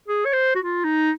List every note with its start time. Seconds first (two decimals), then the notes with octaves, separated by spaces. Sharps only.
0.08 G#4
0.26 C#5
0.33 C5
0.55 F#4
0.59 F4
0.84 D#4